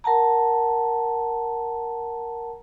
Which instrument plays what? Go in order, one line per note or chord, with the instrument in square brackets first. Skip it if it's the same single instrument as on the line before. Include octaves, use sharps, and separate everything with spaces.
[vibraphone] A#4 F#5 A5 A#5